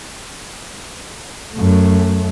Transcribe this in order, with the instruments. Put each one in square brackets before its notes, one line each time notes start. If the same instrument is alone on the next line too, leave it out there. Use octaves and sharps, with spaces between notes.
[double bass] F#2 A3